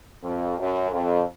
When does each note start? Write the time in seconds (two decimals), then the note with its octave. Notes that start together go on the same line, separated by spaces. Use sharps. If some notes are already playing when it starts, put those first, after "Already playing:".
0.23 F2
0.58 F#2
0.91 F2